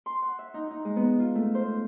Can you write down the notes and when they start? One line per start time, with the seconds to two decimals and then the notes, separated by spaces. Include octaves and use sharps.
0.06 C6
0.22 F#5
0.39 E5
0.54 D#4
0.71 D#4
0.85 G#3
0.96 B3
1.19 F4
1.35 A3
1.55 C5